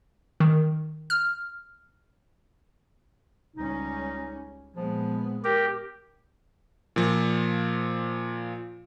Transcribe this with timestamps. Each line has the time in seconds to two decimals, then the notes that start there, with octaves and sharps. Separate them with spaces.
0.40 D#3
1.10 F6
3.56 C#2 G3 C#4 D#4
4.76 A#2 F3 G#3 B3
5.44 G4 A#4
6.96 A#2 F3